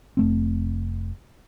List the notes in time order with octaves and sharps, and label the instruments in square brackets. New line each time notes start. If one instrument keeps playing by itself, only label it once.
[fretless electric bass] F1 A3 C4